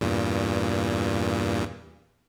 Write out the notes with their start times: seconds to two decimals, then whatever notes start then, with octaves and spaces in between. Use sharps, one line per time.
0.01 E2 G2 A#2